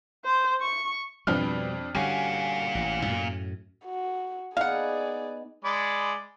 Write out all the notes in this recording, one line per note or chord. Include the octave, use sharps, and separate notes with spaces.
C5
C#6
F2 B2 G3 D4 B4 F6
A#2 D3 G3 C#4 F#4 G4 F5 G#5
A1
F#2 A2
F#4
B3 D#4 G#4 D5 F5 F#5 B5
G#3 D5 B5